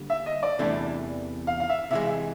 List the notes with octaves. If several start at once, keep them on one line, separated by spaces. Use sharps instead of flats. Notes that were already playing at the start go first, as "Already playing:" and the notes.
Already playing: D3 G3 A#3
E5
D#5
D5
E2 C3 E3 A3 D4
F5
F5
E5
C3 E3 G#3 E5
E5